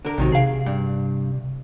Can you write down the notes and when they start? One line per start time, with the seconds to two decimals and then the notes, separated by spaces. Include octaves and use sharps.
0.05 D3 A#4
0.18 A#1 C3 D#3 F#3
0.32 C3 G#4 F5
0.66 G2